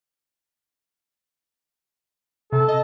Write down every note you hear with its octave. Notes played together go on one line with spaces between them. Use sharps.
C3 A4
D#5